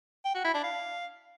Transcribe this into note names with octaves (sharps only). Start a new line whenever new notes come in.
G5
F#4
E4
D4
F5